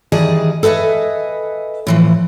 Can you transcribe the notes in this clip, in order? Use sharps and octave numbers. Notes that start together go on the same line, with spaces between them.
D#3 E3 G3 G#4 D#5 A5
A4 B4 D#5 E5 G#5
A2 E3 F3